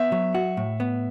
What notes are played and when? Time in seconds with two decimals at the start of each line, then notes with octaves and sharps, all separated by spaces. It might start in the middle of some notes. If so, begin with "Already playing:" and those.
Already playing: B3 E5
0.12 F#3
0.35 F#4
0.57 A2
0.80 B3